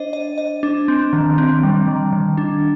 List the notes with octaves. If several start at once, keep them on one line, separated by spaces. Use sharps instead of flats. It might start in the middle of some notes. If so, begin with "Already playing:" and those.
Already playing: D4 C5 D#5
D#5
D#5
D4
C4
D#3
C4
G3
D#3
D#3
D4